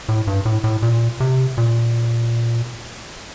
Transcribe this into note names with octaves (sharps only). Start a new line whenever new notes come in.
A2
G2
A2
A2
A#2
C3
A#2